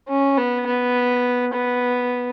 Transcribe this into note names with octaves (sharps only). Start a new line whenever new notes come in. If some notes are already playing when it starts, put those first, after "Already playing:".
C#4
B3
B3
B3